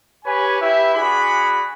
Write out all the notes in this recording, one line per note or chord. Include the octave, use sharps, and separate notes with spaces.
G4 B4 C#5 G#5
E4 G4 B4 E5
D4 F#4 G#4 D5 F#5 B5